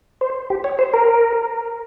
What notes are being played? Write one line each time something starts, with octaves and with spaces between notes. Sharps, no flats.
C5
G4
C#5
C5
A#4